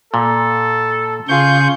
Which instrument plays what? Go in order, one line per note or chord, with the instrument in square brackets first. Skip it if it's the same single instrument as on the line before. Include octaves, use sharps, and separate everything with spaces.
[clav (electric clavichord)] A#2 [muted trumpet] A4
[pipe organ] C#3 C#6 G6 [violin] F4 G#4